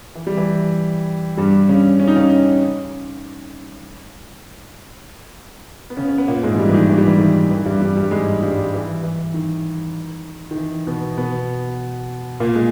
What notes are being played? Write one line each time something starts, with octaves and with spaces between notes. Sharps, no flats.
E3
G3
E3
G2 G3
C#3 C#4
C#4
D#4
C#3 C#4
B3
C#3 C#4
C#4
B3
A#2 A#3
G#2 G#3
E3
G2 G3
E3
D#3
E3
G3
E3
D#3
E3
G2 G3
G2 G3
G2 G3
G#2 G#3
G2 G3
E3
E3
D#3
D#3
E3
B2 B3
B2 B3
A#2 A#3
G#3